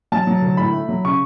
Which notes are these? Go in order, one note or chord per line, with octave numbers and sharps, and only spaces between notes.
F#3 A5
F#3
D2
A2 B5
A3
F#3
C#3 C#6